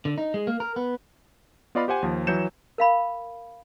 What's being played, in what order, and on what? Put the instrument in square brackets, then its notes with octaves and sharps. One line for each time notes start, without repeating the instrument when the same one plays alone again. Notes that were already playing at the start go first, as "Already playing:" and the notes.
[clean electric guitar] D3
D#4
G#3
A#3
A#4
B3
[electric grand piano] B3 F4 D5 D#5 F5 B5
G4 C5 F#5 G#5
D#2 F3
E3 F#3 G6 C#7 E7
[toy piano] A#4 F5 B5